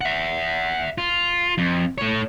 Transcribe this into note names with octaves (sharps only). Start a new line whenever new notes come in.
E5 F#5
F4
F2
A3 C#5